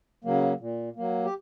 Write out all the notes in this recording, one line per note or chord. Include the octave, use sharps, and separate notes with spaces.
C#3 F#3 A#3
A#2
F#3 A#3
G4